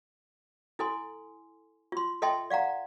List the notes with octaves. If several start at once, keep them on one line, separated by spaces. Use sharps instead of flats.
E4 A4 G#5 C6
F4 C6
A4 D#5 E5 G5 A5 C6
D5 F5 F#5 A#5